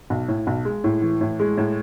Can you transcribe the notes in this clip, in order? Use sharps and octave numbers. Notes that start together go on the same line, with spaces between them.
B1
A2
B1
G#3
A2
E3
A2
G#3
A2